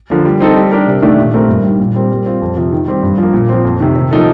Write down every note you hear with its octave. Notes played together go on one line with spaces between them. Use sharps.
D3 F3 A#3
G3
C4 D#4 A4
G3
D4 G4 A#4
C3
D#3 A3 D4 G4
A#2
A3 C4 G4 A#4
G2
D#3 G3
A#2
G3 C4 G4 A#4
G3
C4 F4
F2
C3 F3
D#3
G3 C4 G4
G2
F3 A#3
A#2
F3 C4
F2
C3 D#3
C3
F3 A#3 D#4 A4